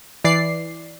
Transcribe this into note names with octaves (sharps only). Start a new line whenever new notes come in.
E3 D5 C7